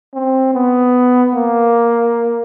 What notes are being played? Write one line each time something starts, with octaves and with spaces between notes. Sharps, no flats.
C4
B3
A#3